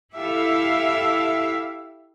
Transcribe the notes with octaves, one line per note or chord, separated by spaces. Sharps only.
E4 G4 A4 E5 F5